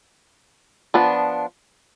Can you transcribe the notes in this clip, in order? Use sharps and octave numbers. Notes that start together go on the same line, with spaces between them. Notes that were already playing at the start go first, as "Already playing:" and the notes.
F3 B3 D4